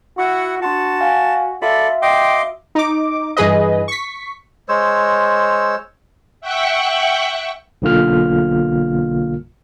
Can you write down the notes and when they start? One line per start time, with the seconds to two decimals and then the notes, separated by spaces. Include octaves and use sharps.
0.18 E4 F#4 F#5 C#6
0.62 D4 F#4 A5 C6 C#7
1.01 F5 G#5
1.62 F#4 A4 D5 E5 F5 B5
2.02 D#5 G5 C6 D6
2.75 D#4 D6
3.37 G2 E3 G#4 B4 D#5
3.88 C#6 B6
4.69 G#3 C5 C#5 E6
6.41 E5 F#5 G5 C#6 F#6
7.82 B1 B2 D3 A#3 F4 F6